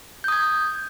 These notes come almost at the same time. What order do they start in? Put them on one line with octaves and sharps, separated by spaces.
G6 D#6 G#6